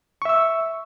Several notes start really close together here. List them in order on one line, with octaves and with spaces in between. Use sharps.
C#6 E5 E6